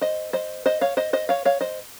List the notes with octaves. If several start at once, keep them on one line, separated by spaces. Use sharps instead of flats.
C5 D#5
C5 D#5
C5 D#5
C#5 F5
C5 D#5
C5 D#5
C#5 F5
C#5 F5
C5 D#5